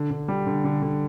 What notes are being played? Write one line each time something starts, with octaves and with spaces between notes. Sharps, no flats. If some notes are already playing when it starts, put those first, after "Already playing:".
Already playing: D3
D3
G3
D3
D3
D3